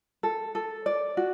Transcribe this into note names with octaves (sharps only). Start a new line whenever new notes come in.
A4
A4
D5
F#4